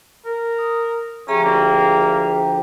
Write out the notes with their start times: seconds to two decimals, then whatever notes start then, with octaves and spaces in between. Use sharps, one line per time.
0.25 A#4
0.59 D#6
1.28 D2 F3 C#4 G4 G#4 E5 A#5
1.44 A#3